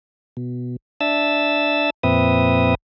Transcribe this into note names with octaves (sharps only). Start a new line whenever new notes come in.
B2
D4 E5 E6 A6
F2 A#2 C4 B4 E5 D#6